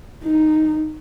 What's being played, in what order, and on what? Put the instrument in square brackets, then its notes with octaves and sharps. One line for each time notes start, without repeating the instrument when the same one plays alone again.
[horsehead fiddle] D#4